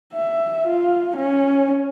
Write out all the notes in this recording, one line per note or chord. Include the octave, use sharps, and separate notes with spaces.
E5
F4
C#4